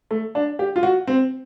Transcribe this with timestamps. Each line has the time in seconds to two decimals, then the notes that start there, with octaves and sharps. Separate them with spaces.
0.11 A3
0.35 D4
0.59 G4
0.76 F4
0.83 F#4
1.07 C4